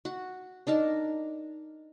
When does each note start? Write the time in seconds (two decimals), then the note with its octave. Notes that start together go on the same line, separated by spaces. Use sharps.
0.05 F#4
0.67 D4 D#4 A#4 A5